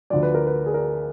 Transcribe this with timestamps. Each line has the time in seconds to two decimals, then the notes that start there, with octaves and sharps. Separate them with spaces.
0.10 D2 D3 F3 D5
0.23 B4
0.35 A#4
0.47 B4
0.66 G#4
0.74 A#4